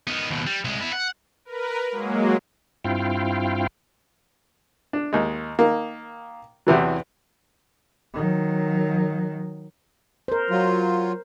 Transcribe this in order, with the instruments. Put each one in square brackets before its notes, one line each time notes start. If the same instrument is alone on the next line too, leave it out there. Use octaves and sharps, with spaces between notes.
[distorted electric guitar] D#3 B3
D#2 B2
G3
C2 G#3
B3 E4
F#5
[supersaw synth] A#4 B4
F#3 G#3 A#3
[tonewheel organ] G2 C4 E4 F4 F5 G5
[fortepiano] D4
D#2 G#3
D#3 A#3
E2 C3 E3 F#3
[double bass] D#3 F#3
[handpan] A#4 C5
[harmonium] F#3 F4